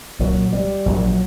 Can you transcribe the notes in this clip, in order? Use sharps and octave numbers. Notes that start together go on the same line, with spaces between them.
C2 A#2 F#3
G3
A#1 A#2 F#3